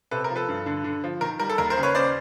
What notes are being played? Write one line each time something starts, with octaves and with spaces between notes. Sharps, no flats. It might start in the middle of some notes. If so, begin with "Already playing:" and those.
C3 A4 B4
A#4
F3
A4 B4
G2
D3
D3
F3
D#3 A#4
G3 A#4
A4
D#2 A#4
A#4 C5
C#3
B4 C#5
C#3 C5 D5